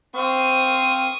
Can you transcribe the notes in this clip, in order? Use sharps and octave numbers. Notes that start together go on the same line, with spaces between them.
C4 C5 F5 C#6 D#6